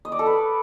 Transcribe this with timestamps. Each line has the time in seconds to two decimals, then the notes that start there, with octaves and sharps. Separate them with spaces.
0.05 D#5
0.12 D5
0.19 A4
0.26 B4